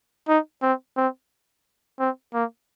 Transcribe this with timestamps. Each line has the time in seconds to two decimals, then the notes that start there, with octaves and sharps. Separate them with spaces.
0.28 D#4
0.63 C4
0.97 C4
1.99 C4
2.34 A#3